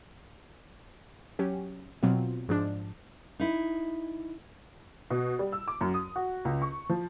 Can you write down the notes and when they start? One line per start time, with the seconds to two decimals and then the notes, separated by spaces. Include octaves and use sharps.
1.39 F#3 C#4 G4
2.03 B2 F#3 C4 F4
2.49 G#2 F3 D4
3.39 D#4 E4
5.10 B2
5.39 G3
5.52 E6
5.68 D6
5.81 F#2
5.94 D#6
6.16 F#4
6.45 C#2
6.62 C#6
6.89 F3